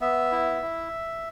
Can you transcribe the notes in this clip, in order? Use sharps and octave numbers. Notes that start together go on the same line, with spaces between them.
B3 E5
E4
E4